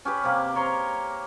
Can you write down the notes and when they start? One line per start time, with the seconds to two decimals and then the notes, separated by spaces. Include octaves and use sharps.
0.05 C#4 G4 B4
0.24 C3 A#3 C4
0.55 A#4 C#5 A#5 C6